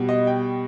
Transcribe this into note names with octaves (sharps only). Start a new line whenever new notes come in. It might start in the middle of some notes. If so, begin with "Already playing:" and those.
Already playing: B2 G3
D#5
G5